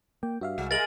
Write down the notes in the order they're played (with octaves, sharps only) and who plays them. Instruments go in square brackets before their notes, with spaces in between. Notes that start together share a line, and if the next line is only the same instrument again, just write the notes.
[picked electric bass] A#3 [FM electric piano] G5
[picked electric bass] G2 [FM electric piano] F#4 E5 F5
[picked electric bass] C2 [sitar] G#3
[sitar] G#3 A#4 [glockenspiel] A6 F#7